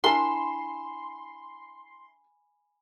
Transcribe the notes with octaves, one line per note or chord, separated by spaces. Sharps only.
D4 E4 A#4 G#5 C6